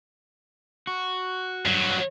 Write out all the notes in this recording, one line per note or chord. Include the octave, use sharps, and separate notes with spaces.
F#4
G2 F#3